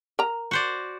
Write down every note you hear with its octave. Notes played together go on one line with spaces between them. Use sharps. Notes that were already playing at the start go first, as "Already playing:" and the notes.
A#4 A#5
F#4 C5 D5